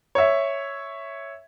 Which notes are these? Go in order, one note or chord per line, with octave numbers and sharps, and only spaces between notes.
C#5 E5